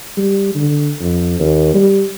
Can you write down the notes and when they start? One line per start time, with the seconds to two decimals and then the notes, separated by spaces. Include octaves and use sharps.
0.17 G3
0.55 D3
1.00 F2
1.39 D#2
1.74 G3